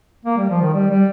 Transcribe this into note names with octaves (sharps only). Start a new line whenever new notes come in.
A#3
G3
F3
D#3
G3
G3